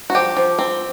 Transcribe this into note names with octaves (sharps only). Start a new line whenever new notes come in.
F#4
F3 G4
F3
C4